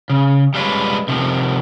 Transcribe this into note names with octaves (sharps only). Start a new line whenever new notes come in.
C#3
G3 G#3 F4 B4 C#5 D5
C3 D#3 F3